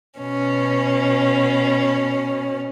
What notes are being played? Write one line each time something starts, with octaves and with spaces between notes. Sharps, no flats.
B2 C#4